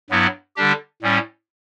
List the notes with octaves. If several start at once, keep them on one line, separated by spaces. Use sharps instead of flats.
G2 F#3 B3 E4
D3 G3 D4 G4
A2 G3 C#4